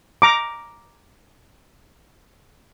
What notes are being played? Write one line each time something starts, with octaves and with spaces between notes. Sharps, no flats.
A#5 D6